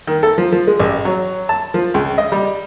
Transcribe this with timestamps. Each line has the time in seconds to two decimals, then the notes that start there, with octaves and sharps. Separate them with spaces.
0.07 D#3
0.23 A4
0.38 F3
0.52 F3
0.67 G#3
0.80 A1
1.05 F#3
1.49 A5
1.74 F3
1.94 C#2
2.18 D#5
2.32 G3